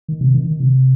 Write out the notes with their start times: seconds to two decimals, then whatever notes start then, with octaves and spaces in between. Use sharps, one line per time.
0.08 D#3
0.21 C3
0.34 D#3
0.47 D#3
0.60 C3